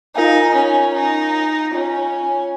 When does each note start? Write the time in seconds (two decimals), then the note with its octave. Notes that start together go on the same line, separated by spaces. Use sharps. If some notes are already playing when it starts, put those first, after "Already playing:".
0.15 D#4 F4 A#4 F5 G#5
0.55 C#4
0.95 D#4
1.73 C#4 F4 C#5 G#5